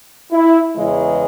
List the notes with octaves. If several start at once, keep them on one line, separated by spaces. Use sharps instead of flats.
E4
E2 C#3 E3 G#3